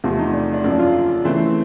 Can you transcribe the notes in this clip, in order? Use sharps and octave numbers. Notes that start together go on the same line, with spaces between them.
E2 C3 F3 A3 C4
D#4
D4
D4
F#2 C#3 F3 A#3 D4
F4
C#3 E3 A3 C4